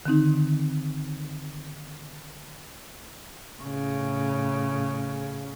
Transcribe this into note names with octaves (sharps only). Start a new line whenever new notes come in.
D3 D#3 C4 D#4
A2 C#3